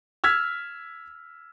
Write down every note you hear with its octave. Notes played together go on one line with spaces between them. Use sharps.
E6 F6 G#6 B6